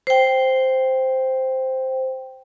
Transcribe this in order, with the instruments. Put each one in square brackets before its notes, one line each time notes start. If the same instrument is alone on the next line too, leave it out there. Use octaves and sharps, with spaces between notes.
[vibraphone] C5 G5